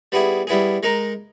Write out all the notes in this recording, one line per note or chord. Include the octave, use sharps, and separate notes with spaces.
G3 B3 E4 G#4
G3 B3 E4 G#4
G#3 D#4 A#4